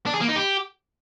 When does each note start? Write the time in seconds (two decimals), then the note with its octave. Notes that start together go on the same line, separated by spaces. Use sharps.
0.06 D4
0.14 G#4
0.21 A#3
0.29 D#4
0.36 G4